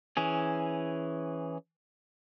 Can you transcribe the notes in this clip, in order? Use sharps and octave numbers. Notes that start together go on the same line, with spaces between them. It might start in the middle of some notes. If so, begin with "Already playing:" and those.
E3 C#4 G#4